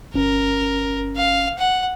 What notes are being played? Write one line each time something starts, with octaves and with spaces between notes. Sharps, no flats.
G1 C#4 A#4
F5
F#5